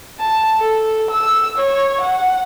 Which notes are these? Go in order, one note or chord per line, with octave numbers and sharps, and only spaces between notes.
A5
A4
E6
C#5
F#5